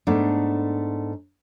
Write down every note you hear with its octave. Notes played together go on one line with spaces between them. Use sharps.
G#2 A3 B3 D4